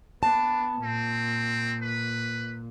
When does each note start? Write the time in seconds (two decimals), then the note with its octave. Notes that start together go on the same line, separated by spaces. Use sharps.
0.23 B3 D4 A5
0.83 A#2 C4
1.82 B4